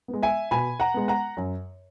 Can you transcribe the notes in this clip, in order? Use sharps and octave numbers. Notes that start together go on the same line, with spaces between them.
B3
G#3
E5 G#5
B2 G#5 B5
F#5 A#5
G#3 B3
F#5 A#5
F#2